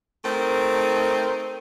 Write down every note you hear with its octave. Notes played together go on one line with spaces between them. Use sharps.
A3 C4 D#4 A#4